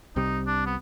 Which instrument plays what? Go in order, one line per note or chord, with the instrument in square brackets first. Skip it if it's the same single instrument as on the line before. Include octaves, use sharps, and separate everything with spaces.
[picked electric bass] C2 C3 G3 [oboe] D#4
[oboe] D4
B3